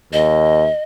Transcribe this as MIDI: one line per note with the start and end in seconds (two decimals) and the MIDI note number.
0.13 0.68 39
0.13 0.83 75